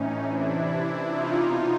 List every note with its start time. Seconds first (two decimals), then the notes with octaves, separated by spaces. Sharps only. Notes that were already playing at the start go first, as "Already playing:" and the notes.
Already playing: A2 E3 C#4 D#4
0.24 C3 E3 D4 E4
0.52 D4 E4
0.81 C3 E3
1.08 D#4 F4
1.36 B2